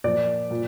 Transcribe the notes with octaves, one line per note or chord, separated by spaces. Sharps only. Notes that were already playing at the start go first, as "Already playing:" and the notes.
A#2 F3 D5
A#2